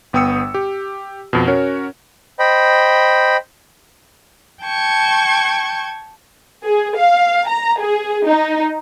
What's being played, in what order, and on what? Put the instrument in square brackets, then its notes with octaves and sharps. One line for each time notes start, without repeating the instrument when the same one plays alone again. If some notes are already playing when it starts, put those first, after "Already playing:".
[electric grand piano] G1 B3 G5 D#6 E6 C#7
G4
F2 B2
C#4 F#4 A#4 C#5
[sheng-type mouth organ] C5 D#5 G5 B5
[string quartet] G5 A5 C#6 G#6
[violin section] G#4
F5
A#5
G#4
D#4